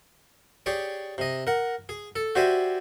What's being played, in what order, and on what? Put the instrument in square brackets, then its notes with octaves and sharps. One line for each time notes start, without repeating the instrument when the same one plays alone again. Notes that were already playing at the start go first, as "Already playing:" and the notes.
[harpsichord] G4 G#4 C#5 D5
C3 D#5
A#4 F#5
G#4
A4
F#4 G4 C5 D5 E5 G#5